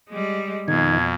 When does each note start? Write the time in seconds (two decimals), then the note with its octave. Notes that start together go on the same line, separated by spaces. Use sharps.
0.10 G3 G#3
0.68 F2 B2 D#3 G#6